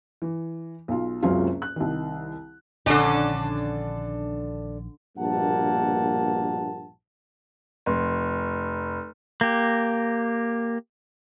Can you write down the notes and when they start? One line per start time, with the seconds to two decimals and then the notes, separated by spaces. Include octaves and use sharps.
0.22 E3
0.88 B1 F4
1.23 F#1 C#2 C3 F#3 C#4 F4
1.62 F#6
1.76 C2 D#3
2.86 A#1 D3 D#3 C#4 D4 A4
5.18 A#1 G2 B2 A#3 F#5 A5
7.86 F1
9.41 A#3 G4